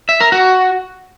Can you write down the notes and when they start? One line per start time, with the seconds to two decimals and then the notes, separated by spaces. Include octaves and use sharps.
0.09 E5
0.20 A#4
0.32 F#4